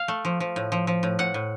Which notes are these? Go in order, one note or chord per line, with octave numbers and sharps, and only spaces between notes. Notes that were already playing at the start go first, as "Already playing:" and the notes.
Already playing: F5
A3
F3
F3
A2
F3
F3
A2
A2 F#5
A2